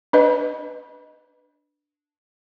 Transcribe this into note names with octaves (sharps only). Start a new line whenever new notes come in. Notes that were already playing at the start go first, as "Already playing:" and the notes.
D4 B4 D#5